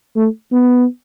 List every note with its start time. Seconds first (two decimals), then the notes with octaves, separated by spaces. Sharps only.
0.16 A3
0.52 B3